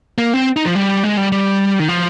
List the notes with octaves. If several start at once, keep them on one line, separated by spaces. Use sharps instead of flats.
A#3
C4
D#4
F3
G3
G#3
G3
G3
D#3
F3